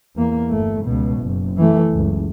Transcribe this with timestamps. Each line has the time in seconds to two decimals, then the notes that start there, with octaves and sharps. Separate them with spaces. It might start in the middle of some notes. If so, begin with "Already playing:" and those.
0.16 E2 A#3
0.49 G1 A3
0.85 C#2 B2
1.21 F#1
1.57 E3 A3
1.92 F#1 C#2